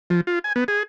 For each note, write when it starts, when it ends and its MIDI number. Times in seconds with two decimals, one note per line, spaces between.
0.10 0.21 53
0.27 0.39 65
0.44 0.53 80
0.56 0.64 59
0.68 0.83 68